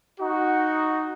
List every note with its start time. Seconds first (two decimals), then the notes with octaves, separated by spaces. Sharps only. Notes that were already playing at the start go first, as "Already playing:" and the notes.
0.19 D#4 F#4